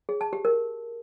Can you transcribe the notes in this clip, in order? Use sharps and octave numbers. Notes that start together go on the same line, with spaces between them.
G#4
A5
G4
A#4